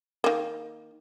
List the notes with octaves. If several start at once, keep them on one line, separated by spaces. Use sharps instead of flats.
D#3 A#3